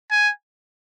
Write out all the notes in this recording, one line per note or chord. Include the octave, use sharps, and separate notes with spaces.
G#5